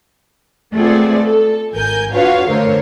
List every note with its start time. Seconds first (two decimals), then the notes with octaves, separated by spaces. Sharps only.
0.75 A3 B3 C4 F4 G#4 D5
1.24 A4
1.73 G#1 A#4 G#5 G6
2.13 D4 F4 F#4 B4 C#5 F5
2.47 D3 A3 A#4 C5 C#5